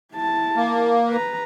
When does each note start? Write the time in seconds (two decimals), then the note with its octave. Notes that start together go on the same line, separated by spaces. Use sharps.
0.14 E4 A5
0.56 A#3
1.09 B4 A#5